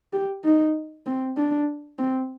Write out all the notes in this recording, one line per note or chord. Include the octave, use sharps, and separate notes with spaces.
G4
D#4
C4
D4
C4